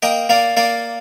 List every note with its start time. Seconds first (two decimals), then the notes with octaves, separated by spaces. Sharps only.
0.02 A#3 D#5 G5
0.29 A#3 D5 F5
0.57 A#3 D5 F5